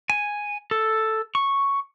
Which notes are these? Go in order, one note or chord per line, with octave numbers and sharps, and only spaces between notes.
G#5
A4
C#6